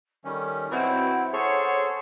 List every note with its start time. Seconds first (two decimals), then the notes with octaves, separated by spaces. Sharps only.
0.25 D#3 G3 C#4 A4
0.71 B2 F#3 C4 E4 F#5
1.32 C#3 G#4 A4 C5 C#5